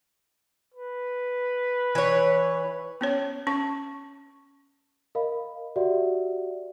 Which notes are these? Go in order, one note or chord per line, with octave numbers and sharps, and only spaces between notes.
B4
E3 C#5
B3 C#4 C#5
C#4 C#6
A#4 D#5 F5 B5
F#4 G4 D5 E5 F#5